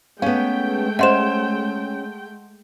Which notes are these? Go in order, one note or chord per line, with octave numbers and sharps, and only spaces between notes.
G#3 A3 B3 C#4 F5 G5
C#4 C5 D#5 E5 F#5 C6 E7